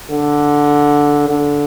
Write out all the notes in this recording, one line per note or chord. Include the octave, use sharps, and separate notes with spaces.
D3
D3